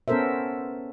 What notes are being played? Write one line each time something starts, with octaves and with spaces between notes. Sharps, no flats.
B3 C#4 A4 A#4 C5 E5